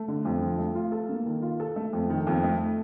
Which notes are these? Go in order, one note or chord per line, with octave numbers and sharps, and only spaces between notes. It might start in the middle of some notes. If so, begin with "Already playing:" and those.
Already playing: A3
D3
F2
F3
A3
F4
A4
A#3
D#3
F4
A4
A3
F2
D#3
F2
A3